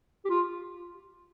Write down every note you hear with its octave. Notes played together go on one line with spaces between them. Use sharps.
G4
F4